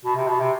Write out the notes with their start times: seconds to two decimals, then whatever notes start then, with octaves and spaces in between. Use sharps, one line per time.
0.05 B2
0.16 C3
0.27 B2
0.40 C3